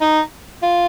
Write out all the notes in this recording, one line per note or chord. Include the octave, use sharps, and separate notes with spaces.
D#4
F4